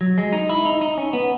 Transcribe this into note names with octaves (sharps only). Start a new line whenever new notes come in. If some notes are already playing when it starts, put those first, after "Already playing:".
F#3
G#3
D#4
E4
D#4
D#4
C#4
B3